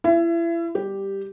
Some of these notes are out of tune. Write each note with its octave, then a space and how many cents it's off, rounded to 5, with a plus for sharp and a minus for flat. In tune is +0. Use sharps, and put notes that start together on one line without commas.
E4 +30 E5 +40
G3 +10 G4 +0